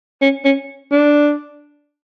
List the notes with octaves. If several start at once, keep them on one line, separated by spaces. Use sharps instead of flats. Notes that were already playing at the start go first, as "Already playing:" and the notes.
C#4
C#4
D4